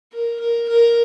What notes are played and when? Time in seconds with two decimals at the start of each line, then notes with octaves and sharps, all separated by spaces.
0.13 A#4
0.40 A#4
0.68 A#4